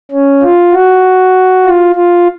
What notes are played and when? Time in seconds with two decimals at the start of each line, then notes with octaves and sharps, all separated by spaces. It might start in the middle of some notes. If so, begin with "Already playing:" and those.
0.11 C#4
0.42 F4
0.73 F#4
1.64 F4
1.95 F4